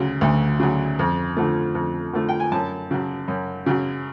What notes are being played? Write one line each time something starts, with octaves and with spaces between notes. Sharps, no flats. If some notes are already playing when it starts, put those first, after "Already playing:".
Already playing: D2 C#3 F#3
D2
C#3 F#3
F2
D3 F3 A3
F2
D3 F3 A3
G5
G#5
F#2 A5
C#3 F#3
F#2
C#3 F#3